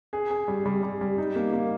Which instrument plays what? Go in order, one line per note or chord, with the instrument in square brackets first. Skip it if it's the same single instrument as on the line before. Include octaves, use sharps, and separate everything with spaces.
[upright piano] G#4
G#4
G3
G3
G3
G3
D#4
A#3
A#3